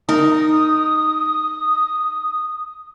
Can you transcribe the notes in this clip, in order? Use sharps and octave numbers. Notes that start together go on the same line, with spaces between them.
D#4 A#4 D#6